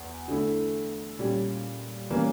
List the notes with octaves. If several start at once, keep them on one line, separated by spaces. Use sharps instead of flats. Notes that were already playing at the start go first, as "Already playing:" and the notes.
Already playing: E2
D3 A3 E4
A#2 G3 C#4 G4
E3 G3 A#3 C#4